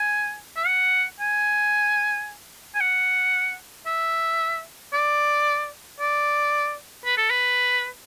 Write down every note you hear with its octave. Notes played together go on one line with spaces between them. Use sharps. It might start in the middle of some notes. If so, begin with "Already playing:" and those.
Already playing: G#5
E5
F#5
G#5
G#5
F#5
E5
D5
D5
B4
A4
B4